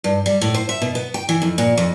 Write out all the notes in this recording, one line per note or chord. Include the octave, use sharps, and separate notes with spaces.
G2
G3
A2
C5
E5
B2
B3
G5
E3
F2
A#2
F2